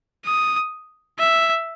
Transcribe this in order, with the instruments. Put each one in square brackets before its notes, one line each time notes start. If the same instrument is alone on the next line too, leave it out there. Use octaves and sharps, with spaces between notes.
[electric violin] D#6
E5